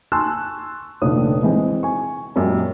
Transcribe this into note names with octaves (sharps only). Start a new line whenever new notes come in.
G#5 A5 C6 C#6 E6 F#6
F1 A#1 D3 D4 C#5 D#6
E3 G#3 C4
G#5 C#6
F#2 A#2 G3 G#3 C#4